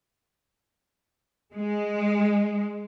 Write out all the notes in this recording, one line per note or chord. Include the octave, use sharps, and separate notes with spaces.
G#3